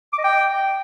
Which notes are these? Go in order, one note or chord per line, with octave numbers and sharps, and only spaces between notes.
D6
D#5
G5